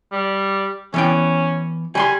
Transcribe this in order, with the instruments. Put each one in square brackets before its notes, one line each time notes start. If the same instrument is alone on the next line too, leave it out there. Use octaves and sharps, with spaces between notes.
[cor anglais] G3
[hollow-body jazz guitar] E3 B3 G5 [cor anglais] C#4
[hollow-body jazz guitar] G3 B5 C6 [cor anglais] G#5